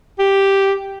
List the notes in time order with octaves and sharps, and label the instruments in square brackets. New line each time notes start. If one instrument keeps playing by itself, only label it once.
[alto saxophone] G4